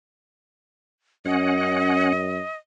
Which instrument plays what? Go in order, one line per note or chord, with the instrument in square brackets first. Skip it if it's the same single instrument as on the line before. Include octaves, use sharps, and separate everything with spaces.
[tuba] F#2 [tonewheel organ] C#4 F#5 [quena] D#5